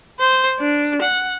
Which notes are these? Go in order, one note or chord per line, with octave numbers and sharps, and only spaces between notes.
C5
D4
F#5